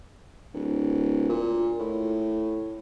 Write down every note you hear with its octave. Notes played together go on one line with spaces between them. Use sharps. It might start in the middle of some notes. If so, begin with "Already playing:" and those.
D1
A#2
A2